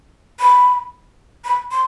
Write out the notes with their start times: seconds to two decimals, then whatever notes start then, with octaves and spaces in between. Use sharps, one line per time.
0.39 B5
1.45 B5
1.71 C6